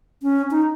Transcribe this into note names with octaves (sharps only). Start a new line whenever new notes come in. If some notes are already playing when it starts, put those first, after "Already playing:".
C#4
D#4